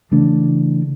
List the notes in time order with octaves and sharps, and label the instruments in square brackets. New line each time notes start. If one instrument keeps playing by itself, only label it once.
[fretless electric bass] C#3 E3 A3 D4